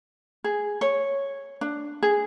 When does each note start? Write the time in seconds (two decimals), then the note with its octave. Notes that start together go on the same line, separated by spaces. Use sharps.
0.44 G#4
0.81 C#5
1.61 D4
2.03 G#4